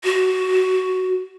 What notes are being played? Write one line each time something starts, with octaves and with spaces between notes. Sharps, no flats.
F#4